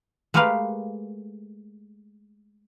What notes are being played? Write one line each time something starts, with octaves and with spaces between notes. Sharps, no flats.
G#3 A3 G4 A#4 B4 F5